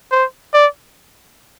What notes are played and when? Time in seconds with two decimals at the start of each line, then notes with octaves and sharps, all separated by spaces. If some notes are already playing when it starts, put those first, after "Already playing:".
0.12 C5
0.53 D5